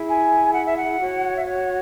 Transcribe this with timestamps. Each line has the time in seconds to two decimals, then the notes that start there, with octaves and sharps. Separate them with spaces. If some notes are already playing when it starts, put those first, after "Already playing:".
Already playing: E4 G#4
0.10 G#5
0.54 F#5
0.66 E5
0.77 F#5
0.99 F#4 C#5
1.37 E5
1.44 C#5